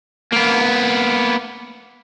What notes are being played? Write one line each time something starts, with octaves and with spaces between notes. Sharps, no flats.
A#3 B3